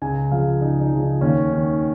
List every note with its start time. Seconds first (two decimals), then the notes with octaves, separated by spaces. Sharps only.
0.02 C#2 G#5
0.31 C#3 F3 F5
0.61 C#2 D#4
0.81 D#4
0.92 C#3 F3
1.02 D#4
1.21 D#2 C#4
1.52 D#3